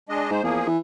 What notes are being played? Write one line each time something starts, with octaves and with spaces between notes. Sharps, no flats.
G#3 D4 D#5
G#2 C5
E2 F3 A#3 G#4
E3